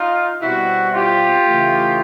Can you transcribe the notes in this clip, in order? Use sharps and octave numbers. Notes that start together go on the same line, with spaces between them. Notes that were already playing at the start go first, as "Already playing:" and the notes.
Already playing: D#4 F4
B2 G3 C4 E4 F#4
F4 G4
C#3 E3 A3